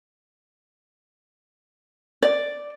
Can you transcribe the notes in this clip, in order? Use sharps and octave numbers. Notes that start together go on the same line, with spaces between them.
D5